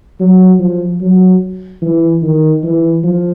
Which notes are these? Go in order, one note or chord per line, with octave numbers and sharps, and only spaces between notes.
F#3
F3
F#3
E3
D#3
E3
F3